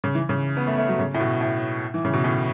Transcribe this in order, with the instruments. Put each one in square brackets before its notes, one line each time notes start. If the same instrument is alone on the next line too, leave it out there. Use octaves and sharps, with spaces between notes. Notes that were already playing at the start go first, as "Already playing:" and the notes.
[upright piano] C#3
E3
C#3
B3
A3
A3
F#3
C#3
A2
B2
A2
E3
C#3
B2
A2